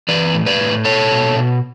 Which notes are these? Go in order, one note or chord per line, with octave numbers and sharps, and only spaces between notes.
E3 B4 D5
A2
B4 D5
A2
B2 A4 C#5
B2
B2